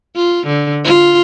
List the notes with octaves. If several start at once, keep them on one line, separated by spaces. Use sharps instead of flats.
F4
D3
F4